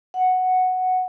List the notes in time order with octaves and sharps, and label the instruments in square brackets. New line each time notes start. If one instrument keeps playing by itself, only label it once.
[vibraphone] F#5